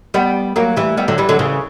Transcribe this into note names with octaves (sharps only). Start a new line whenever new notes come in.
G3 B3
F#3 A#3
E3 G3
G3 B3
D3 F#3
E3 G3
D3 F#3
C#3 E3